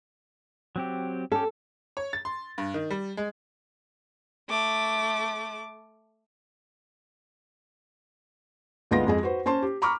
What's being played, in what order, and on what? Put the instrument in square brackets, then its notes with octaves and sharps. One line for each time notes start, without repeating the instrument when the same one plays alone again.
[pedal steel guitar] F#3 C4 G4
[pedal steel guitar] C#4 G4 [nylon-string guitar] A4
[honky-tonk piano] C#5
A6
C6
G2
D#3
G3
G#3
[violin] A3 D6
[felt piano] D2 G#3 B3 F4 C6 A#6
F2 G#3 G#4
F#4 B4 C5
C#4 C5 A5 C6
G4
A#5 B5 C#6 D6 F6